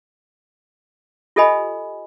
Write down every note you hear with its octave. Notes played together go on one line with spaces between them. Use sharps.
F4 G4 A4 D#5 G#5 B5